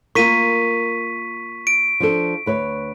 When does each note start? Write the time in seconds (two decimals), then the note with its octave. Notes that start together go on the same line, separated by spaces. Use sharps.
0.15 A#3 F4 A#4 C#6 B6 D#7
1.67 D7
2.00 F3 D4 A4
2.46 D2 B4 C#5